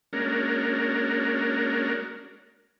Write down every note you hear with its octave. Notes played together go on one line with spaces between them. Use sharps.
G#3 A#3 C#4 D4 F#4 A#4